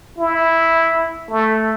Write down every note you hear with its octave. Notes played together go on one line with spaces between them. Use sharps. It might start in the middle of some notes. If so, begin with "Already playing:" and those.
E4
A3